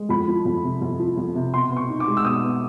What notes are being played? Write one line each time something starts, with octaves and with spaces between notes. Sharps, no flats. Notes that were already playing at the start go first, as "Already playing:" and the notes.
Already playing: G#3
F2 B5
F3
F2
C3
F2
F3
F2
C3
B2 C6
B3
C#6
D#4
D6
G#3
E6
B2 D#6
B3